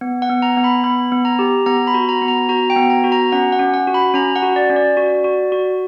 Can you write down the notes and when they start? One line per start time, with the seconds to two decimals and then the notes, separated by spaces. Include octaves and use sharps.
0.01 B3
0.22 F#5
0.29 B3
0.42 A#5
0.57 B3
0.64 B5
0.84 B3 B5
1.12 B3
1.25 A#5
1.39 G4
1.66 B3 A#5
1.87 B5
1.94 F#4
2.09 A#5
2.21 B3
2.28 A#5
2.49 F#4 A#5
2.70 G5
2.76 B3
2.90 A#5
3.04 F#4
3.12 A#5
3.32 C#4 F#5
3.52 F#5
3.59 C#4
3.74 F#5
3.87 F#4
3.94 B5
4.14 C#4 A#5
4.36 F#5
4.43 F#4
4.56 D5
4.70 C#4
4.76 D5
4.97 F#4
5.24 F#4
5.52 F#4